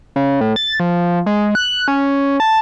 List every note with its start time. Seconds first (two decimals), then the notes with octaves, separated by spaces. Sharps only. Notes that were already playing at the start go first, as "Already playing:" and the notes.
0.16 C#3
0.41 A2
0.56 A6
0.80 F3
1.26 G#3
1.55 F#6
1.88 C#4
2.40 A5